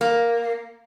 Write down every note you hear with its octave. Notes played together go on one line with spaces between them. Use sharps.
A#3